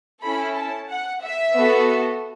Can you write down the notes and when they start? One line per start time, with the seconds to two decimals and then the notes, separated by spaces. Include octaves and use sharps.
0.23 C#4 E4 A4 B5
0.56 A5
0.90 F#5
1.22 E5
1.55 B3 F#4 A4